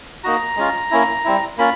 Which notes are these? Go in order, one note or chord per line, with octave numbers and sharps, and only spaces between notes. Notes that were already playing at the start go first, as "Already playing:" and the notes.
A#3 D#4 F#4 A#5
G#3 C#4 F4
A#3 C#4 E4
G3 C4 E4
A#3 C#4 F4 B5